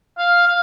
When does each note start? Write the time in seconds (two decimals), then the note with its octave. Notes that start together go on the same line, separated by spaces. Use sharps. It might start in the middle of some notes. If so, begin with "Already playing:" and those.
0.18 F5
0.48 F5